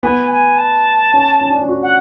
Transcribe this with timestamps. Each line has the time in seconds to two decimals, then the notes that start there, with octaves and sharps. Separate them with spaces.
0.03 B3 G#5
0.31 G#5
0.58 A5
1.14 C#4
1.41 C#4
1.50 D4
1.59 C#4
1.68 F#4
1.83 F#5